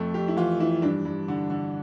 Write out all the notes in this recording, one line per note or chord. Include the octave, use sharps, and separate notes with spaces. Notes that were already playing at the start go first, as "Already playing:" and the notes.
Already playing: F2 A3
F2 G4
E4
E3 F4
E3 E4
G2 D4
G2
D3
D3